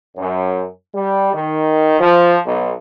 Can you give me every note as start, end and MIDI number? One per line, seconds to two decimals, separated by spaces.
0.17 0.65 42
0.94 1.33 55
1.34 1.99 51
2.00 2.36 53
2.46 2.72 35